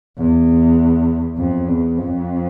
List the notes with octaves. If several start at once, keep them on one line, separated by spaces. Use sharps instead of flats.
E2
F2
E2
F2